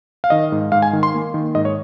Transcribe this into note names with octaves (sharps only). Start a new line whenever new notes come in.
F5
D#3 D#5
G#2
G#2 F5
G#5
D#3
C6
A#3
D#3
G#2 D#5
C#5